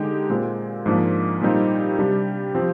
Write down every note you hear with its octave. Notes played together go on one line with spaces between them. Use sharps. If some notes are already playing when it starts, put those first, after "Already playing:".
Already playing: D3 G#3 D#4 G4
A#2 G#3 C4
G#2 F3 A#3 D4
A#2 G3 C4 D#4 G4
C3 G3 D4 G4
F3 C4 G4